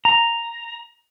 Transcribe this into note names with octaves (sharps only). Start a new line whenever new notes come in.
A#5